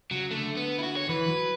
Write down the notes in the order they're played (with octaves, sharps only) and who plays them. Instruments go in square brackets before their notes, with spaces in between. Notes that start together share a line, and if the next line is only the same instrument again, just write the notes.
[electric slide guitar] C#3 [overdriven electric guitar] F#3
[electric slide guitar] D3 [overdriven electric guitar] A3
[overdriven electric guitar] B3
E4
F#4
C#5
[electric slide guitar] E3 [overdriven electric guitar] B4
[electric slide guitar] F#3